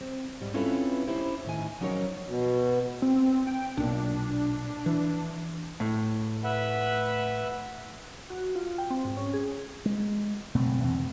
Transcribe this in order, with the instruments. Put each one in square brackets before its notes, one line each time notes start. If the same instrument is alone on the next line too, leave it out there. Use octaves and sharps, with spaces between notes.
[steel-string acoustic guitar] C4
G#2 G3
C4 C#4 E4 F4 A4 B4
C#4 D#4 E4 G4 C5
A2 D#3 G#5
F3 F#3 C#4 D#4 A#4 C#5
[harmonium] B2
[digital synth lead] C4
G5
[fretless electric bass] B1 A#2 [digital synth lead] D4
[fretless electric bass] E3
[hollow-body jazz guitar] A2
[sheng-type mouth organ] B4 E5 F#5
[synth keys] F#4
F4
G5
C4
G#2
C#4
G#4
[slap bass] G#3
F#1 B2 A3 C4
E2 C3 E3 C4